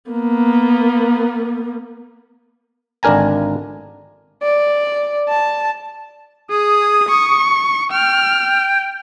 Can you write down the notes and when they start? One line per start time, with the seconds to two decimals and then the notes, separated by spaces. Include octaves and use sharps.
0.10 A#3 B3
3.03 G#1 D3 D4 A#4 G#5 A#5
4.42 D5
5.28 A5
6.50 G#4 D#6
7.09 C#6
7.92 G5 F6